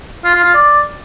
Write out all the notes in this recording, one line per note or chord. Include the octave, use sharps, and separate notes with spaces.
F4
F4
F4
D5